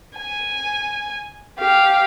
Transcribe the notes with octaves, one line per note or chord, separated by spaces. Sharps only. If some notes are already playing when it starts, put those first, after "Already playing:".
G#5
G4 F5